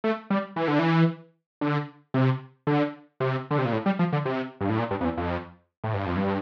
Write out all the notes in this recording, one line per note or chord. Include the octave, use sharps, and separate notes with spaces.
A3
G3
E3
D3
E3
D3
C3
D3
C3
D3
C3
A#2
A2
G3
F3
D3
C3
G2
A2
A#2
G2
F2
E2
F2
A2
G2
F2
G2